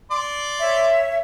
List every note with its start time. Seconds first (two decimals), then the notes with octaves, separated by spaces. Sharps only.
0.11 D5 C6
0.60 C#5 E5